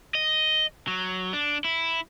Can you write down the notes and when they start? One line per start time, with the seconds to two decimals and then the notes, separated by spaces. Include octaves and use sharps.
0.15 D#5
0.88 F#3
1.33 D4
1.64 E4